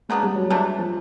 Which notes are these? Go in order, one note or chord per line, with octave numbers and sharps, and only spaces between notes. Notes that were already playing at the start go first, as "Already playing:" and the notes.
C#3 F#3 G#3 B3 D4
G3
F#3
C3 E3 G3 A3 D4
F3